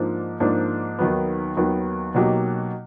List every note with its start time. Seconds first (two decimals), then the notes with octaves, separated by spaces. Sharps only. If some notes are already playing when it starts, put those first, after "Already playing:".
Already playing: G#2 F3 A#3 D4
0.40 G#2 F3 A#3 D4
0.99 D#2 D#3 F#3 B3
1.57 D#2 D#3 F#3 B3
2.14 B2 F#3 A#3 D#4 G4